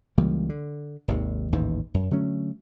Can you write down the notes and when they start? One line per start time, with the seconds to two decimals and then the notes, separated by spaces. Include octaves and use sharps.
0.18 C#2 E3 G3 A#3
0.49 D3
1.08 G#1 D#2 C3
1.52 A1 D#2 G#2 E3
1.94 F#2
2.11 D3 F#3 A3 C#4